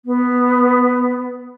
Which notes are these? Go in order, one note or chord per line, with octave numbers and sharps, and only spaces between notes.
B3